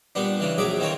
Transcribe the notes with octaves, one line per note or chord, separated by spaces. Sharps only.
A#2 G3 B3 D4
C#3 E3 D4
A#1 F#3 G#4 E5 D6
D#3 E3 A#3 C4 C#5